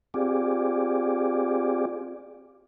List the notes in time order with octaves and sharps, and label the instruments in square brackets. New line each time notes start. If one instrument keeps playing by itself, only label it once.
[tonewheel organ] C4 F4 G4 G#4 D5